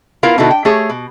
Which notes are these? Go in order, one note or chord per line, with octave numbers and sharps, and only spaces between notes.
B3 E4 F4 A#4 F5
B2 D3 D#4 E4 F#4 A4
G5
A3 G4 G#4 C#5
B2